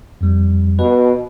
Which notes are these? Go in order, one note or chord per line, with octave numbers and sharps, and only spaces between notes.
F2 G3
B2 B4